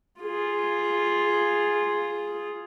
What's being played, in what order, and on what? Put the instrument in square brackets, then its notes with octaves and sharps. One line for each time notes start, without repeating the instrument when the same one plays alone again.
[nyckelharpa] F4 G#4